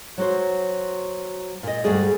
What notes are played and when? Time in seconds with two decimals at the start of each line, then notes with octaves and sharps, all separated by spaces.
0.18 F#3 F#4 C5
1.63 A#2 D#5
1.84 D2 G2 G3 A3 G#4 D5